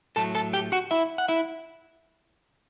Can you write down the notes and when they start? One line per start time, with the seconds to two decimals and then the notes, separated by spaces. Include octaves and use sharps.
0.16 A2 F#3 A3 A4 A5
0.35 A4 A5
0.53 G4 G5
0.72 F#4 F#5
0.91 E4 E5
1.18 F#5
1.28 E4 E5